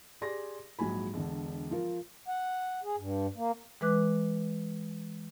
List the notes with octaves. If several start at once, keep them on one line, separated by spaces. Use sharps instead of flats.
G4 G#4 D5 C6 A#6
A#1 G#2 F#3 G#3 G#5 B5
E1 D3
F3 F4 A#4
F#5
G#4
G2
A#3
E3 G#3 B4 D6 F#6